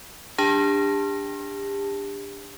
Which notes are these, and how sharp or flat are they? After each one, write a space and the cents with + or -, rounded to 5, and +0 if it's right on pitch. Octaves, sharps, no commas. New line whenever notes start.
D4 +0 G4 +35 A5 +0